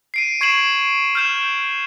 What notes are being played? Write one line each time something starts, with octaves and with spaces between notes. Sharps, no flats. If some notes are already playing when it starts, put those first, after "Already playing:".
C7 D7 D#7
C#6 G#6 C7 D7 E7 F#7
F6 G6 E7